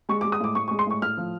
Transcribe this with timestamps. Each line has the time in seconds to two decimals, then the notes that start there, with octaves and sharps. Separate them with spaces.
0.09 G#3 C#6
0.21 D6
0.24 G#3
0.32 D#6
0.40 A2 D6
0.55 A2 C#6
0.68 C#6
0.71 G#3
0.79 C6
0.87 A2 C#6
1.02 A2 F6
1.17 F3